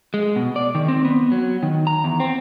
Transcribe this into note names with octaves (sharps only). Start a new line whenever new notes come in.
G#3
B2
D5
D#3
C4
B3
F#3
D#3
A#5
E2
C4